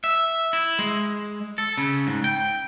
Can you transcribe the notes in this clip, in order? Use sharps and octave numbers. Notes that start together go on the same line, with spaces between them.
E5
E4
G#3
A4
C#3
G#2
G5